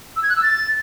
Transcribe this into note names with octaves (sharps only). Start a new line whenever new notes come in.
E6
G#6
F#6
E6
A6